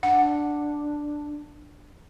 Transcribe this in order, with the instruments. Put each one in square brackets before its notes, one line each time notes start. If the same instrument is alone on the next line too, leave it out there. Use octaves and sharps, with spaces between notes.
[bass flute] D4 [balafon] F#5